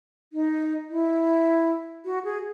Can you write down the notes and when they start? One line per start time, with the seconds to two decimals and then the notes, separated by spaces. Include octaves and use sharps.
0.33 D#4
0.90 E4
2.05 F#4
2.25 G#4